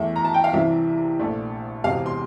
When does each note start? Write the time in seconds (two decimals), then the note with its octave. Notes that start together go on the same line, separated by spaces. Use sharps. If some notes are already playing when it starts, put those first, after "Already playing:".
Already playing: E2 E3 A3 E5
0.16 A#5
0.25 A5
0.34 G5
0.44 F5
0.53 C2 C3 E3 G3 E5
1.19 A#1 A#2 A3 D4
1.84 E1 E2 C3 G3 F5
2.06 C6